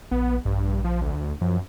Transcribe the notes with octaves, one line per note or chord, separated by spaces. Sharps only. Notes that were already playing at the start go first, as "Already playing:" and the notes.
A#1 B3
A#1 G2
F3
D2
F#2 F3